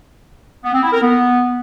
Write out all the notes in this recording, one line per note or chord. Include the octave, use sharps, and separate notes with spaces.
B3
C4
E4
A#4
B3